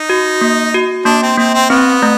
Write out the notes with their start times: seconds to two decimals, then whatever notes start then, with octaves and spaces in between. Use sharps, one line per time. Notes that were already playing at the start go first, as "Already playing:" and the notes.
Already playing: D#4
0.10 F#4
0.41 A#3
0.74 F#4
1.05 A#3 D4
1.22 C4
1.37 A#3 C4
1.54 C4
1.70 B3 C4
2.02 A3